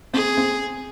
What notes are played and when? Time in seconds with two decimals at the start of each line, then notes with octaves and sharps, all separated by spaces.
0.14 C4 G#4
0.37 C4